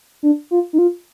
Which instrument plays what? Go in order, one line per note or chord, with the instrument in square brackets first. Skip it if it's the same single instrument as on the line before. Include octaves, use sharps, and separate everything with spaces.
[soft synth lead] D4
F4
D#4
F4